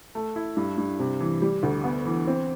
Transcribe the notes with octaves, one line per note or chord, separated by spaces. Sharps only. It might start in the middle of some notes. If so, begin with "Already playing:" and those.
A3
E4
G2
G2
C3
E3
G3
D2
B3
E3
C4